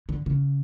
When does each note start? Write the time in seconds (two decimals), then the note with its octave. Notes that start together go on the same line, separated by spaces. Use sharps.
0.09 D3
0.26 C#3